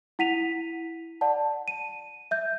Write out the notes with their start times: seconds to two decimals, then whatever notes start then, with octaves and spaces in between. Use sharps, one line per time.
0.19 E4 F#5 B6 D#7 F7
1.21 D5 F#5 A5
1.68 D#7
2.31 E5 G6